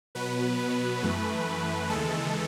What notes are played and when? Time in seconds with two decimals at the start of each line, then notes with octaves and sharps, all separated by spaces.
0.15 B2 F#3 B3 B4
0.59 B4
1.03 F#2 E3 A3
1.89 D#2 C#3 E3 G#3 A4